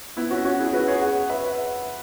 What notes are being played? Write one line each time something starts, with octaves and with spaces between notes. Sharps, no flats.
B3 E4
C#4 F#4
C#4 F#4
E4 G#4
F#4 B4
G#4 C#5
C#5 F#5
B4 E5
B4 E5